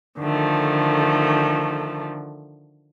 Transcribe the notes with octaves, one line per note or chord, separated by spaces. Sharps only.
D3 D#3 F3 A3